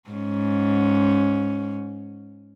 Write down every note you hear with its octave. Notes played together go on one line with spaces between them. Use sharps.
G#2 C#4